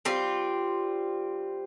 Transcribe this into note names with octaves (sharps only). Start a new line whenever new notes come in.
G3 C4 F4